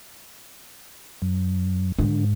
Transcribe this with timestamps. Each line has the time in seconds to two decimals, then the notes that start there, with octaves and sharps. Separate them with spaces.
1.22 F#2
1.99 G#2 D3